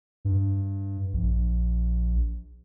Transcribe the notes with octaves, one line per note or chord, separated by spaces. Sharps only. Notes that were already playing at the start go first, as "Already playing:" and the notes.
G2
A#1